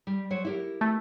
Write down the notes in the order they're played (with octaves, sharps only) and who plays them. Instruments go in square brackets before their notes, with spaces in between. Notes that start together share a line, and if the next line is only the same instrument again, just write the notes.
[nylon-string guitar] G3
F#3 C5 C#5
E4 G4 A#4
[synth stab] A3